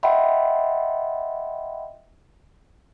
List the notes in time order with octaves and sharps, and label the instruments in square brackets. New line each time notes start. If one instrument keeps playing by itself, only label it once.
[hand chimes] D#5 E5 F#5 G5 B5 C6